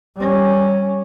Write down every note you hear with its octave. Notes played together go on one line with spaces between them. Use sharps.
G3 C#4